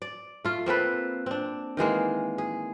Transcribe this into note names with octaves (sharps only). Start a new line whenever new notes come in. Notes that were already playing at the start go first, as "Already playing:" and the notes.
D5
A3 F4
A#3 C4 A4 B4
C4 D4
D#3 E3 G#3 A#3
G#4